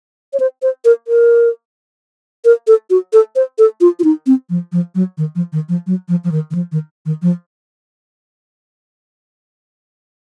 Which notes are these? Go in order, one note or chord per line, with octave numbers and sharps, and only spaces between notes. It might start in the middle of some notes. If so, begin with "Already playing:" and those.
C#5
C5
C5
A#4
A#4
A#4
A4
F#4
A4
C5
A4
F4
F4
D#4
C4
F3
F3
F#3
D#3
F3
D#3
F3
F#3
F3
F3
D#3
D#3
F3
D#3
D#3
F3